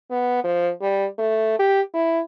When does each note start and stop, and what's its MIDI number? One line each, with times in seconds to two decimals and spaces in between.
0.10 0.40 59
0.44 0.71 53
0.81 1.06 55
1.19 1.55 57
1.59 1.81 67
1.94 2.20 64